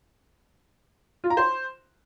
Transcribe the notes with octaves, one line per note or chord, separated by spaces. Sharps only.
F4
A#5
C5